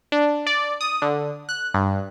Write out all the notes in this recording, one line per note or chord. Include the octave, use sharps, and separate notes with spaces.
D4
D5
D#6
D3
F#6
G2